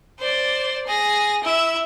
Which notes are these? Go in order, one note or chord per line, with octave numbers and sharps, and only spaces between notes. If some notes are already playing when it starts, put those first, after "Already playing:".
C5 D5
G#4 A#6
E4 E5